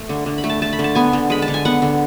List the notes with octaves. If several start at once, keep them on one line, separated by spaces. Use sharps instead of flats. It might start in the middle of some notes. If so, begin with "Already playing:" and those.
Already playing: A3
D3
D3
B5
A3
A5
A3 A5
B5
D3
A5
B3 G#5
D3
G#3 B5
A5
D3
G#5
B3 F#5
D3